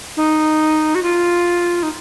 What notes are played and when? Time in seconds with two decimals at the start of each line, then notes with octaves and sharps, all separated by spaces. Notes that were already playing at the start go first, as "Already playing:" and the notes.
0.17 D#4
0.95 F#4
1.03 F4
1.83 D#4